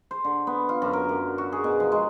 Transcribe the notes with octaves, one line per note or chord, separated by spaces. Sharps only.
C5
D3
B3
F4
F#2
A#4
F#2
F#4
G#4
B2
F3
G#3